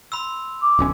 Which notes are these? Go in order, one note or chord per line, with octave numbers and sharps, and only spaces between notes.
B5 C6 E6
D6
D1 B1 C#4